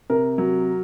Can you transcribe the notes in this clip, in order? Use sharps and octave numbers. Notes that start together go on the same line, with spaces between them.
C3 A#4
F#3